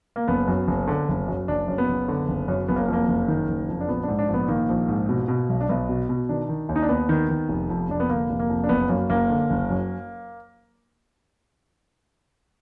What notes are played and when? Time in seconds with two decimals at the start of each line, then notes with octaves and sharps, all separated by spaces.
0.16 A#3
0.28 F#1 B3
0.48 F#2
0.68 F#1
0.87 D3
1.08 F#1
1.28 F#2
1.48 F#1 D4
1.68 F#2
1.78 B3
1.88 F#1
2.08 D3
2.28 F#1
2.48 F#2
2.68 F#1 B3
2.76 A#3
2.88 F2 A#3
3.08 F#1
3.28 D#3
3.48 F#1
3.68 F2
3.81 D4
3.88 A#1 B3
4.03 G#2 D4
4.19 D4
4.28 A#1
4.34 B3
4.48 D#3 A#3
4.69 A#1
4.88 G#2
5.09 B2
5.28 B2
5.49 B1
5.61 D4
5.69 B1 B3
5.89 B2
6.09 B2
6.29 D#3 D4
6.49 D#3
6.69 D#2
6.76 D#4
6.82 D4
6.89 D#2 B3
7.09 D#3
7.29 D#3
7.49 F1
7.70 F2
7.89 F1 D4
8.00 B3
8.09 D3 A#3
8.30 F1
8.39 A#3
8.50 F2
8.64 D4
8.69 F#1 B3
8.89 F#2 A#3
9.09 F#1 A#3
9.30 D3
9.50 F#1
9.70 F#2